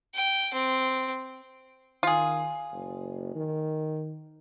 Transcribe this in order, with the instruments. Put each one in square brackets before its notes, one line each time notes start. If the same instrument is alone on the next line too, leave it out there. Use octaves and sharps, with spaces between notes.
[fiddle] G5
C4
[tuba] D#3 [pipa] F4 G#4
[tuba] F#1
D#3